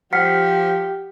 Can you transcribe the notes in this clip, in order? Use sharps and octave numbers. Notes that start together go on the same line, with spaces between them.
F3 G4 F#5 F6 B6 C#7